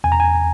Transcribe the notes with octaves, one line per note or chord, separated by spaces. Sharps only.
E2 G#5
A#5
G#5